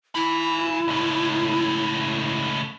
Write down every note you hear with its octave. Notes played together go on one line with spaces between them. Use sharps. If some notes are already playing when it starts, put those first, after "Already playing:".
E4 G#5 B5
C#2 A2